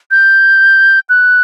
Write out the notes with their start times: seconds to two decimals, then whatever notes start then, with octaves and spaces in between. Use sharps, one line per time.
0.11 G6
1.09 F#6